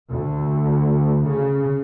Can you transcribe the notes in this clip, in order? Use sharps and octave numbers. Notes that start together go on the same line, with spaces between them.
D2
C#3